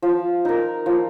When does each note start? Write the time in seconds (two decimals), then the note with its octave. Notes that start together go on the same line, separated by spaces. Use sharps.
0.02 F3
0.45 D#4 A#4
0.86 F3